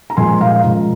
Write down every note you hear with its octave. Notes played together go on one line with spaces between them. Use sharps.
A#5
A#2 F3 G#3 G#5 C6
F5 A#5
A#2 F3 G#3